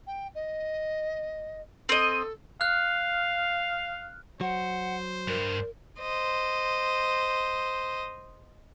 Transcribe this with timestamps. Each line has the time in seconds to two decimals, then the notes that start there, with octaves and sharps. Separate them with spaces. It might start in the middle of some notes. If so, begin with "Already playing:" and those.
0.07 G5
0.35 D#5
1.89 C4 A4 D#5
2.61 F5 F6 F#6
4.41 F#3 C5 F#5
5.28 G2 A#4
6.00 C5 D#5